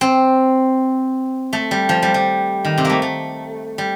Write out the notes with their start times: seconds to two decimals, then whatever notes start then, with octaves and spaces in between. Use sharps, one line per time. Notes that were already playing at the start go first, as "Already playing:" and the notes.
0.01 C4
1.53 A3
1.71 G3
1.89 F3
2.03 G3
2.14 G3
2.65 D#3
2.78 C3
2.85 A3 A#3
3.02 A3
3.78 G3